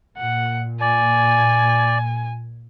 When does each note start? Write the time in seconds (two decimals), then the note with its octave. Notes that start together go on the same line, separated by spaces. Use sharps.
0.17 A#2 F#5
0.81 D5 G#5